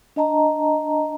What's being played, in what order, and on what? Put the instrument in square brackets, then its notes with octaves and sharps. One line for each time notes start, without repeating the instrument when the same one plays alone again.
[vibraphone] D4 D#5 A5 A#5